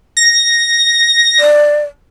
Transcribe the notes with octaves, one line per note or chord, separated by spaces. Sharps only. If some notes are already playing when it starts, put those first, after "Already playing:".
A#6
D5